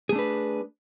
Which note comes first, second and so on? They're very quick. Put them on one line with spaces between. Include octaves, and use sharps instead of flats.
G#4 A3 D4 B4